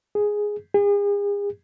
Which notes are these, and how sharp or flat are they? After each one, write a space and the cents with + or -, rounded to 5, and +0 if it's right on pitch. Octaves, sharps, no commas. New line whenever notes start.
G#4 +0
G#4 -40